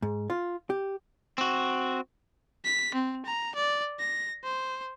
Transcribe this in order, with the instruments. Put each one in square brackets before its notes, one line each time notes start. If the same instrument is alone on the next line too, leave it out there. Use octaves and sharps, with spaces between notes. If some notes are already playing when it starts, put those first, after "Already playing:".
[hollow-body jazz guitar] G#2
F4
G4
[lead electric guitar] C4 F#4
[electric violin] B6
C4
A#5
D5
A#6
C5